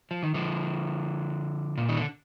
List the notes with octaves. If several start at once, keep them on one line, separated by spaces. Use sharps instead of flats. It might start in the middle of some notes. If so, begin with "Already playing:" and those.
F3
D#3
D3 F3
A#2
D#3
D3